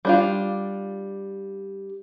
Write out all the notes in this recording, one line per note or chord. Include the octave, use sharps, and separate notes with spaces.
G3 D4 F4